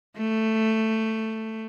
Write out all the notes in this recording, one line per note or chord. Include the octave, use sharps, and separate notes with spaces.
A3